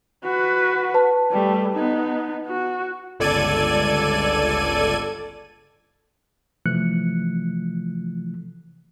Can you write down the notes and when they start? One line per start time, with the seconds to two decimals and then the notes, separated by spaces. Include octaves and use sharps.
0.24 F#4 B4
0.94 B4 A5
1.31 G3 A3
1.73 B3 D#4
2.47 F#4
3.19 G1 C#2 A4 D5 G#6 D#7
6.66 C3 E3 F3 A3 F#6 C#7